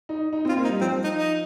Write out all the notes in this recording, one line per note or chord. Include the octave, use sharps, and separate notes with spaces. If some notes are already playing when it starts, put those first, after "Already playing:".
D#4
D#4
C4
F4
A#3
D#4
G3
F3 C4
D#4
D#4